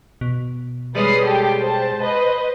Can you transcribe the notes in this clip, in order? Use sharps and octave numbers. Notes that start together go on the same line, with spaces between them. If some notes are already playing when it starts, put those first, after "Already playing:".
B2
G3 G#3 C#4 B4 D#6 C7
G4 A4 G5
C5 A5
B4 C5 D#5